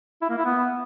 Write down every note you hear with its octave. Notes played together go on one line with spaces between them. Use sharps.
E4
A#3
E4
B3